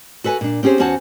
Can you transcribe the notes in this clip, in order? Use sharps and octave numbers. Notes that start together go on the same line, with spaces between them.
F#4 A4 B4 G#5
A#2 D4
C4 C#4 G4 G#4 C5
E2 C#4 F#4 C5 F#5 A5